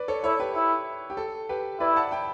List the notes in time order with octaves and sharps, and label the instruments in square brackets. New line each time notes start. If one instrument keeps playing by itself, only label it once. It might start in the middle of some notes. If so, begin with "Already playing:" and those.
Already playing: [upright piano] B4 D5
A4 C#5
[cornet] E4 [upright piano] A4 C#5
[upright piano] G4 B4
[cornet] E4
[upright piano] G4
A4
G4 B4
[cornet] E4 [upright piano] B4 D5
[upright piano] F#5 A5
G5 B5